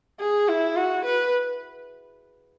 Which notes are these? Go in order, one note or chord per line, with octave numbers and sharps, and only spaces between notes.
G#4
E4
F#4
B4